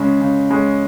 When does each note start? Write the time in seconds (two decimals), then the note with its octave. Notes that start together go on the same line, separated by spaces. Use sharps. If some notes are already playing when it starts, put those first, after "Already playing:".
Already playing: C#3 G#3 C#4 G#4
0.21 C#3
0.51 G#3 C#4 G#4